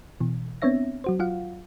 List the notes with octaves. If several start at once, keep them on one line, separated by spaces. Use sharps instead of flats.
B2 E3
B3 C4 D4 C#5 E5 A#6
F#3 F#4 C5
F#3 F4 F5 F#5